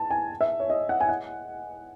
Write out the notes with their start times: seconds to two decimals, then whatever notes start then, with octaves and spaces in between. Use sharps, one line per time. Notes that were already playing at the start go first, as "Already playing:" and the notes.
Already playing: A5
0.10 G#5
0.41 E5
0.60 C#5
0.70 D#5
0.89 F#5
1.00 G#5
1.09 F#5